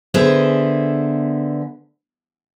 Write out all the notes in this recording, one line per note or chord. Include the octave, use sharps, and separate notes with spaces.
D3 B3 G#4 A4 C5 E5